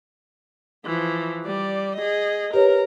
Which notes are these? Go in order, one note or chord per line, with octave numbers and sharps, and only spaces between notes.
E3 F3
G3 D5
G#4 D#5
G4 A#4 B4 C#5